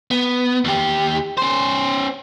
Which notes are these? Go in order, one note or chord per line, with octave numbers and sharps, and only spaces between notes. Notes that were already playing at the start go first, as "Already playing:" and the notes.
B3
D#2 G4
C#4 C5